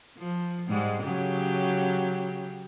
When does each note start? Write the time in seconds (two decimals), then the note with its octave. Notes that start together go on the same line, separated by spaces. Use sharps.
0.18 F3
0.69 G#2 G3 G#3
1.03 C#3 F#3 G4